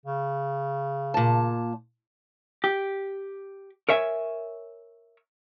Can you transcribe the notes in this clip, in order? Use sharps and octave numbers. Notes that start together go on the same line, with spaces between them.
C#3
A#2 A5
G4
A#4 C#5 E5 G#5